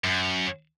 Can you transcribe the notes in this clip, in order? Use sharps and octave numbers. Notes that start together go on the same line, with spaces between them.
F#2